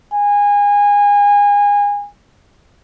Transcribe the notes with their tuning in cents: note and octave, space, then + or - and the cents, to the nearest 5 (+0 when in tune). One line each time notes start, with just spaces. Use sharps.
G#5 -25